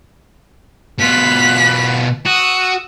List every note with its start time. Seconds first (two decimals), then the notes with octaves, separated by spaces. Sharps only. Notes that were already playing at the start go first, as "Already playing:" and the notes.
1.00 B2 F4 F#6 B6
2.26 F#4 D#6 E6